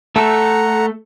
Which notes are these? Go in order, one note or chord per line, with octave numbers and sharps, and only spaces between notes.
A3 A4 F#5 A#5